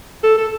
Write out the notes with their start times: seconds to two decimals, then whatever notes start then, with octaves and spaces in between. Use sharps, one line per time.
0.23 A4
0.38 A4